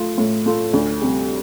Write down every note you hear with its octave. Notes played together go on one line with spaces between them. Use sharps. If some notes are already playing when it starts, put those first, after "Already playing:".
Already playing: A3 F4
A2
A3 F4
D2
C3 G3